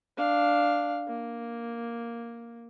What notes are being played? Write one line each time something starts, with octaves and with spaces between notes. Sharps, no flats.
D4 F5
A#3